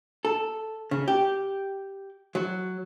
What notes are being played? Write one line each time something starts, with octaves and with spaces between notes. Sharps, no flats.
A4
C#3
G4
F#3